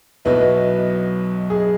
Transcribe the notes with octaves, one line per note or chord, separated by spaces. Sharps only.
B1 B2 F#3 E4 B4
G#4